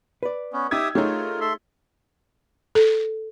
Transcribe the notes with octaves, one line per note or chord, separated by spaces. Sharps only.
B4 D5
B3 C#4
D#4 G4 E5 D#6 E6 G#6
A3 D#4 F4 G4 G#4 A#4 C#5
A4 E5 C6
A4